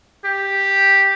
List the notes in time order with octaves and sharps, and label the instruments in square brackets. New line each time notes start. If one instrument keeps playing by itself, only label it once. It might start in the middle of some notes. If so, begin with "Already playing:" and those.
[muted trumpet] G4